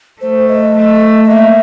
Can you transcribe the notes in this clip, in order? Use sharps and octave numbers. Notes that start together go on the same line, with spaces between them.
A3 C5
D#5
A3
D#5
A#3 E5